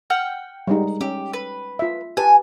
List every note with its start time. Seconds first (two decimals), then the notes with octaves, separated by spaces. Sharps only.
0.10 F#5 G5 F6
0.67 G3 G#3 D#4
1.01 C#4 G4
1.33 B4
1.79 F4 E5
2.17 G4 B4 G#5 A5